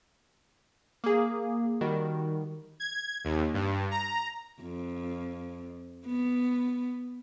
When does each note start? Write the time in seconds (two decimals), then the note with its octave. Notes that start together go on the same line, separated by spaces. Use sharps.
1.04 A#3 G#4
1.81 D#3 G3 F#4
2.80 G#6
3.24 D#2
3.54 G2
3.91 A#5
4.62 F2
6.06 B3